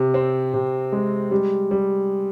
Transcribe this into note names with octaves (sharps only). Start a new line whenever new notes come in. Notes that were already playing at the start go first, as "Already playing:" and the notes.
Already playing: C3
C4
C3
G#3
G3
G3